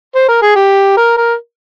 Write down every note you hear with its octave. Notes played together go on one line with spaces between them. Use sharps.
C5
A#4
G#4
G4
A#4
A#4